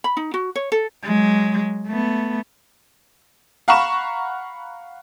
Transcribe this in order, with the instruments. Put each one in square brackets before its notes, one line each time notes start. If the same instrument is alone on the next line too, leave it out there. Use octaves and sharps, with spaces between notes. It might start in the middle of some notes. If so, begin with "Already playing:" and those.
[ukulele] B5
D#4
F#4
C#5
A4
[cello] F#3 G#3
A3 B3
[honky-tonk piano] F5 F#5 A#5 B5 C#6 E7